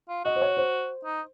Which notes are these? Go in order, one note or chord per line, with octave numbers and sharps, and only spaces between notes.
F4
F#4 D#5
C5
C#5
C5
D#4